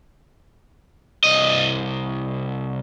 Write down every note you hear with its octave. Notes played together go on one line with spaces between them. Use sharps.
C2 D#5